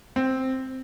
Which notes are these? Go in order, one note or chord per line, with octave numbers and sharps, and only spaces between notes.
C4